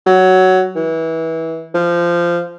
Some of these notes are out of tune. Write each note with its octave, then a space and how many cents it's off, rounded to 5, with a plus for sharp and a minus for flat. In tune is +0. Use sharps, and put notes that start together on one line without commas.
F#3 +10
E3 -25
F3 -15